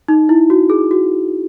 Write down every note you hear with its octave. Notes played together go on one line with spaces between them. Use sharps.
D#4
E4
F#4
G#4
F#4